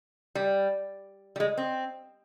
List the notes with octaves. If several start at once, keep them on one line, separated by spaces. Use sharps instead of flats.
G3
G3
G#3
C4